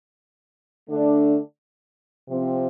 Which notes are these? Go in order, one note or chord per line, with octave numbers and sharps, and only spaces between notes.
D3 A3 D4
C3 F3 C4